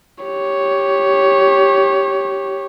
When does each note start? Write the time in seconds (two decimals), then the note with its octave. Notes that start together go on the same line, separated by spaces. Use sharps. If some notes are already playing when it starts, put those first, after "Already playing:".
0.24 G4 C#5